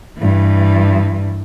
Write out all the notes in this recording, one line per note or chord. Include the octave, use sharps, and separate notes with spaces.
G2 E3